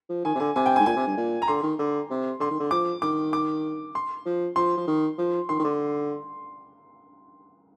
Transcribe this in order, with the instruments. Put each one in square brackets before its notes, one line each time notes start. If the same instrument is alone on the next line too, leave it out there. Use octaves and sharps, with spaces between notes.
[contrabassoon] F3
[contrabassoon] D#3 [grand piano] G#5
[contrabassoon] C3
[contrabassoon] D3 [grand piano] G#5
[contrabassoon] C3 [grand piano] G#5
[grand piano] G5
G#5
[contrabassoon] G#2
[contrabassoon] A#2 [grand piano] G#5
[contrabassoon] C3
G2
A#2
[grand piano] A#5
[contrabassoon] D3 [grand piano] C6
[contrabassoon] D#3
D3
C3
[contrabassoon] D3 [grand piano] C6
[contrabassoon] D#3
D3
[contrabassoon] F3 [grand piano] D6
[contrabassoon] D#3 [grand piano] D6
[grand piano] D6
C6
[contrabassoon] F3
[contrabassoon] F3 [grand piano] C6
[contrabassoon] F3
D#3
F3
[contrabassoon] D#3 [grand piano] C6
[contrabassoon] D#3
D3